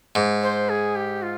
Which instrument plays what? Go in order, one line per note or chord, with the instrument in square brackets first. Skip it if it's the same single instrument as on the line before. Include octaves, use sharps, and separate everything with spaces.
[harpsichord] G#2
[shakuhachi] C5
G#4
G4
F4